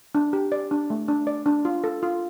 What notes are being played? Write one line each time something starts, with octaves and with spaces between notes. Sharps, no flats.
D4
G4
D5
D4
A3
D4
D5
D4
F4
A4
F4